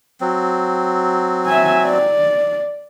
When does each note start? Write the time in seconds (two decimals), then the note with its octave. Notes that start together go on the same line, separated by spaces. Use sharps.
0.21 F#3 C4
1.46 E5 G#5
1.84 D5